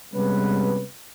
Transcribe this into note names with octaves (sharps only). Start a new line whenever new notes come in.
C3 G3 G#3 B3 C#4 B4